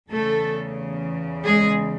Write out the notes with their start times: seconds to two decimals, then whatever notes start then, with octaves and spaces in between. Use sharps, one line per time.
0.10 E2 C#3 E3 A3 A4
1.44 G#3 G#4